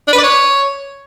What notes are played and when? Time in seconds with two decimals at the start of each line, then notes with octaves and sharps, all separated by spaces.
0.08 D4
0.13 B4
0.18 D5
0.24 C#5